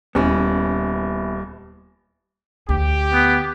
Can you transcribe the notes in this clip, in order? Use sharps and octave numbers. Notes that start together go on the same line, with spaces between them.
D#1 B3 C#4 E4
D2 G4
B3